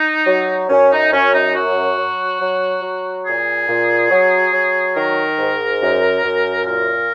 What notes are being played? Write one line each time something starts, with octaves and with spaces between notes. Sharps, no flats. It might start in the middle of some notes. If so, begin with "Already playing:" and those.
Already playing: D#4
F#3
F#2 C#4
D#4
F#2 C#4
D#4
F#3 F#4
F#3
F#3
F#3
A#2 G#4
A#2
F#3
F#3
D#3 A#4
G#2
F#2
F#2
A#2 A#4